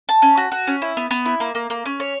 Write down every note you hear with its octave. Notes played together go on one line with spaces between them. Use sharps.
A5
C#4
F#4
F#4
C#4
E4
B3
B3
E4
A#3
A#3
A#3
C#4
C#5